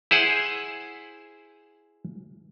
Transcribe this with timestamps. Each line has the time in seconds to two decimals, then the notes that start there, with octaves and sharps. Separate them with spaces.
0.11 E4 G#4 C5 F#5